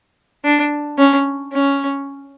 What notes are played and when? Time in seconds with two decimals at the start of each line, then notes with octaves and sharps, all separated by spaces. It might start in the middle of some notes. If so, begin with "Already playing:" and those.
0.44 D4
0.98 C#4
1.53 C#4